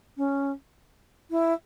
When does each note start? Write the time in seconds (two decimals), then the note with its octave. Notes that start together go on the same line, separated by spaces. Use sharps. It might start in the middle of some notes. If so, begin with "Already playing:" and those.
0.17 C#4
1.31 E4